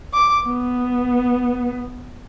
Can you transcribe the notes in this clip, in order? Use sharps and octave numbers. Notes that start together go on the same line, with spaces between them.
D6
B3